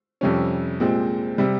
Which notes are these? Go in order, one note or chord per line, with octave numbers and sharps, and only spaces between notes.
F2 C3 G3 C#4
A#2 G#3 C4 G4
C3 G3